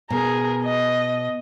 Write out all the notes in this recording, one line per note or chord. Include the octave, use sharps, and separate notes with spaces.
B2 G#4 A#4
D#5